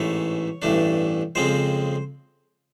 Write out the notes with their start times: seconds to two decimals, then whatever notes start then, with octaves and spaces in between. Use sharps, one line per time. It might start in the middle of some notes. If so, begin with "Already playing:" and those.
Already playing: A1 G#2 E3 A3 C#5
0.62 A1 G2 E3 A3 D4
1.35 F2 C#3 F3 G#3 C4 C5